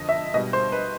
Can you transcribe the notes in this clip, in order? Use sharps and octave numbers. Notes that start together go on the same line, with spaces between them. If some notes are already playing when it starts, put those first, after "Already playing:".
Already playing: F2 D3 F3 D#5
E5
B2 G3 D#5
C5
B4